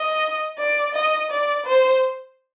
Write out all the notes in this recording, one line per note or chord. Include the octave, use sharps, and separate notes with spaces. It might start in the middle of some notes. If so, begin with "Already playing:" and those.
Already playing: D#5
D5
D#5
D5
C5